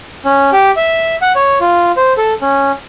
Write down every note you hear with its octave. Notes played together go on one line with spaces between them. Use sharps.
C#4
G4
E5
F#5
C#5
F4
C5
A4
C#4